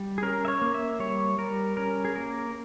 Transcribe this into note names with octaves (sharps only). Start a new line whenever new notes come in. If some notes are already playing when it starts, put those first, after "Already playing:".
Already playing: G3
G#4
C#4 A#4
E5
C#5
A#3
E5
G3 C#5
G3 A#4
C#4 A#4
G#4
A#3 A#4